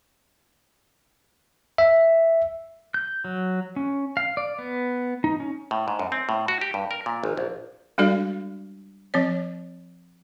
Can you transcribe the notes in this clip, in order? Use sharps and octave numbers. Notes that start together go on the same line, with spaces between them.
E5
G6
F#3
C#4
F5
D5
B3
D#4
C#4
A2
G#2
F#2
C4
A2
F#4
G4
G2
A#4
A#2
G#1
A#1
G3 G#3 D4 F#4 A4 D5
F3 C4 C#5